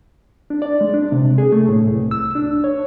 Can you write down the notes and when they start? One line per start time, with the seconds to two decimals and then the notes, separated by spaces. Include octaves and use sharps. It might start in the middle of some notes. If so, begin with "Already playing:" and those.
0.50 D4
0.62 D5
0.81 G#3
0.94 D4
1.12 C3
1.38 G#4
1.52 A3
1.69 A2
1.87 C2
2.11 E6
2.35 D4
2.64 C#5